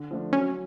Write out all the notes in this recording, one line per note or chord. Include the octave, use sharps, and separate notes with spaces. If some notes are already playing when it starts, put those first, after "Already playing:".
Already playing: D3
F3 A3 D4
F#3 C#4